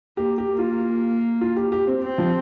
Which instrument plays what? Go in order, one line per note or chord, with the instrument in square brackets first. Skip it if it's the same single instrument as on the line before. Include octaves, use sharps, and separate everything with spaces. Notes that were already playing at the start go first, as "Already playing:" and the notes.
[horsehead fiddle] A#3 [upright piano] G4
[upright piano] G4
[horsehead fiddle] A#3
[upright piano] F4
F4
G4
G4
C4
[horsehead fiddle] C4
[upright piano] F3